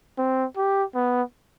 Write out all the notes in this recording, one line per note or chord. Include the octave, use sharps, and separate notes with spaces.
C4
G4
B3